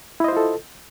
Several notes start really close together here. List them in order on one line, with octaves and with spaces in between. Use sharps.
E4 D#5 C5 F4 A4